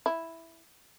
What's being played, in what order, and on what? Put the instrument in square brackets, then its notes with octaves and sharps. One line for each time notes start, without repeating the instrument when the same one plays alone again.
[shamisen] E4